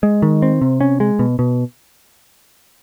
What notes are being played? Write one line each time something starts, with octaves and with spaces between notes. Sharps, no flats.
G#3
D#3
C4
C3
C#4
G#3
B2
B2